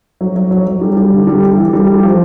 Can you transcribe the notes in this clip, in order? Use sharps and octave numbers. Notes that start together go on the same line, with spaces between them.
F#3
F#3
F#3
F#3
G3
G3
D3
G3
G3
E3
G3
G3
F3